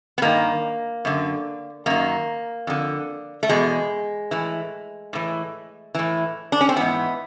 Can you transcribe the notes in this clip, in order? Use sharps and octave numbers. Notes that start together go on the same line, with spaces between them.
B3
G2 D#3 A#3
F#2 D3
F#2 D#3 A#3
F2 D3
A3
E2 B2 G#3
A2 E3
A2 E3
A2 E3
D4
C#4
C4
G#2 E3 B3